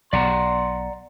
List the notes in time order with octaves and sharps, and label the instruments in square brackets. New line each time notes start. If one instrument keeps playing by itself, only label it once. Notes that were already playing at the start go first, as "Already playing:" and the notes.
[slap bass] B1 [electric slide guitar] D5 F#5 A#5 [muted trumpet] C6